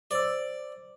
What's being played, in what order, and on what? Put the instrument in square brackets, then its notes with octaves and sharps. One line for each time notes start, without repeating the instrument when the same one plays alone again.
[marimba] C5 E6 [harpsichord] D5